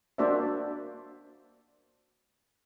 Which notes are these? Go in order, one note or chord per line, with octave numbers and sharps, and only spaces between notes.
A#3 D4 F#4 C5 D5 E5